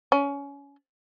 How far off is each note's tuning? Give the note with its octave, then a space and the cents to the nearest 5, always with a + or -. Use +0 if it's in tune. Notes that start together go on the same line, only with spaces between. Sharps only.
C#4 +25